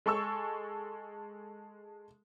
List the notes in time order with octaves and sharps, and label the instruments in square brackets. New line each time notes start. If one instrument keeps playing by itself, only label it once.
[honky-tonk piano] G#3 A4 C#6 E6